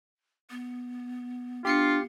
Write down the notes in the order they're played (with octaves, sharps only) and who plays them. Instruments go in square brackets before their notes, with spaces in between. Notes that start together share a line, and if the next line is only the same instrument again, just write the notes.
[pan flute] B3
[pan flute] B3 [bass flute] D4 [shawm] F4 [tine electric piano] G4 C7 C#7